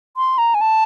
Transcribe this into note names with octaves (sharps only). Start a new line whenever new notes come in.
C6
A#5
G#5
A5